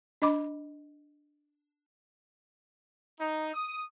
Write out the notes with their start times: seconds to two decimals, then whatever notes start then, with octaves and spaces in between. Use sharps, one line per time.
0.22 D4 D#5 B5 D6
3.19 D#4
3.53 D#6